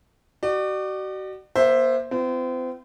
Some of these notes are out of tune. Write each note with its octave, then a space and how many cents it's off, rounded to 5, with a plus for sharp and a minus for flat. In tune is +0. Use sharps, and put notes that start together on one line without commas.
F#4 +40 D5 +40
A#3 +40 C5 +0 E5 +0
C4 -35 F4 -40